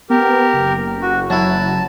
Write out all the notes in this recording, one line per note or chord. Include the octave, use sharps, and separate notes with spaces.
B3 G4 A#4
F#1
F#4
F#3 E4 A5